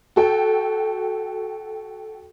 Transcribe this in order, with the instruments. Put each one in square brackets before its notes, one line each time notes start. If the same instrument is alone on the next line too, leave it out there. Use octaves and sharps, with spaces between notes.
[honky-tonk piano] F#4 A4 G5